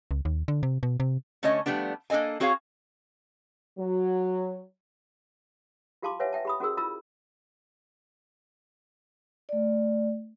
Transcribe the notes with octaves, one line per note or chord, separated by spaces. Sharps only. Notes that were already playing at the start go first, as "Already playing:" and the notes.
C#2
D#2
D3
C3
B2
C3
D3 A3 C#4 C#5 D#5
F3 G3 A3 B3 D4
A#3 D4 A4 D#5 G#5
C4 F#4 G#4 C#5 D#5 F5
F#3
F4 G4 F5 A5 C6 D6
B4 C#5 E5 F#5 G#5
E5 G5 A5
G4 B5 D#6
C#4 F#4 G#4 A#4 E6
E4 F4 A#5 B5 E6
A3 D5